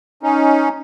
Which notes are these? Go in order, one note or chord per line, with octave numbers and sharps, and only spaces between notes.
C#4 D#4